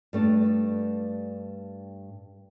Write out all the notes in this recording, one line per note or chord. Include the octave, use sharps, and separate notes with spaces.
G2 A3 D4